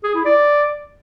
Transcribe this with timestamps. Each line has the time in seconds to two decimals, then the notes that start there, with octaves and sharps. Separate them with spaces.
0.04 G#4
0.15 E4
0.25 D5